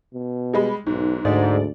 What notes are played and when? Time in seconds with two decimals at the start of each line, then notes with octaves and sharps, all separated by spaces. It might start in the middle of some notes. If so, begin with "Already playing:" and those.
0.13 B2
0.54 G3 G#3 B5
0.87 B1 G#2
1.25 D2 G#2 D5